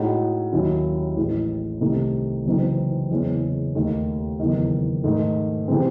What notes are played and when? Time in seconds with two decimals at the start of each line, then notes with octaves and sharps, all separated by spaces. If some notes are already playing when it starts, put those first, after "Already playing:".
Already playing: A2 G#3 D#4 F#4
0.52 D#2 D#3 F#3 C#4 E4
1.16 A1 A2 G#3
1.81 C2 C3 D#3 A3 D#4
2.45 F#1 F#2 E3 C4 D#4
3.11 F#1 E2 C#3 G#3 C#4
3.75 D#2 D#3 A3
4.39 F#1 E2 D#3
5.04 G#2 D#3 A3
5.68 C3 E3 G#3 C4